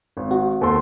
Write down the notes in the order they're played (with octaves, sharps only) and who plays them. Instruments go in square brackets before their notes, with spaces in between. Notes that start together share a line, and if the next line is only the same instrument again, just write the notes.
[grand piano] G#1
[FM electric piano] F#4
[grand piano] D#2 A4 C6